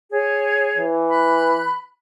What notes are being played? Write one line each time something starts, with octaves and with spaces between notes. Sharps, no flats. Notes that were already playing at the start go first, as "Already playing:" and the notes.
G#4 C#5
E3
B5 F#6